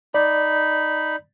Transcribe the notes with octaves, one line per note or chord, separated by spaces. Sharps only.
D#4 D5 B5